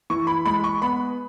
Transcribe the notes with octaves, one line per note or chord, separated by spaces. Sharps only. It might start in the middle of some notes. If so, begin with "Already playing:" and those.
E3 C#6
B5
G#3 B5
C#6
B3 B5